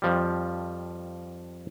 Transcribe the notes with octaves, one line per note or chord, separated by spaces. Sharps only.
F2 F3 G3